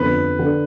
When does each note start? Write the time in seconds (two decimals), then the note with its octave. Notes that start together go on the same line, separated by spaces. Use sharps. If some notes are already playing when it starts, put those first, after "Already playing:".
Already playing: G1 F2 D3 B4
0.39 D3